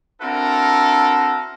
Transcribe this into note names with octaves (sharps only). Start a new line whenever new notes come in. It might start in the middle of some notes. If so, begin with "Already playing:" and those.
C4 D4 E4 F#4 A4 A#4